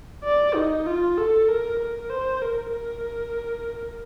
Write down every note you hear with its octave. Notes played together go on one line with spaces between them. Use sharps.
D5
D#4
F4
A4
A#4
A#4
C5
A#4
A#4